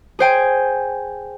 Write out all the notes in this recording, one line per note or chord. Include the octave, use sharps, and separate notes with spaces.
G#4 C5 G5 G#5